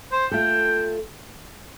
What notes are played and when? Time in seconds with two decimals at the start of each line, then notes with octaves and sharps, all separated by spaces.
0.12 C5
0.31 A3 F4 A4 G5